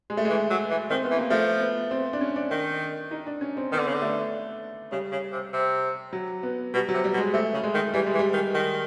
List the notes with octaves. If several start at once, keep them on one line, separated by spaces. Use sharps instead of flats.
G#3
A3
E3 G#3
F#3
E3
D#3 C4
B3
E3
A#3
F3 A3
B3
C4
D4
C#4
D4
D#3
D#4
D4
C#4
C4
D#3 B3
D3
C#3
D3
A3
C#3 G3
C#3
C3
C3
F#3
B3
B2 G3
F#3
C3
G3
B2
G#3
C3 A3
C#3
G#3
D#3
E3 G3
G#3
E3
G3
D#3
D#3